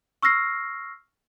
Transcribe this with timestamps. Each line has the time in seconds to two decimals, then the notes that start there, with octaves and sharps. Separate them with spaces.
0.22 C#6 E6 F6 A#6 C7